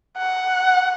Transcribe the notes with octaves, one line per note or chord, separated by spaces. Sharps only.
F#5